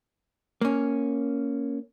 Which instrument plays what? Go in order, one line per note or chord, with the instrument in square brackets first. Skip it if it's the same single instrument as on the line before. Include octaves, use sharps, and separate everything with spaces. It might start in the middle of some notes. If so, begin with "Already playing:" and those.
[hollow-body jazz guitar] A#3 C#4